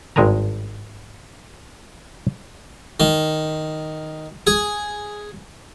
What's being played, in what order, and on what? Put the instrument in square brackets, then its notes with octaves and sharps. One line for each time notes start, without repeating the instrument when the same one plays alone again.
[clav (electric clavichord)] G#1 G2 G#3 A#4 G#5 A#5
[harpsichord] D#3
G#4